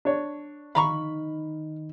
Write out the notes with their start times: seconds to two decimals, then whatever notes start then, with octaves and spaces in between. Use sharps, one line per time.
0.05 D4 C#5
0.75 D#3 F5 A#5 B5 C#6